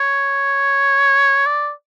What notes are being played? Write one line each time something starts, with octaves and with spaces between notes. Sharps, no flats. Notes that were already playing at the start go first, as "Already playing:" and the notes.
Already playing: C#5
D5